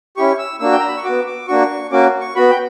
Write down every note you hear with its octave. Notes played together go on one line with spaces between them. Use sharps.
C#4 E4 G4 C#6
E6
A#3 D4 F#4 E6
G5
A#5
B5
C#6
B3 F#4 D6
D6
A#3 D4 F#4 C#6
A#3 C#4 F#4 D6
C#6
B3 F#4 B5
G5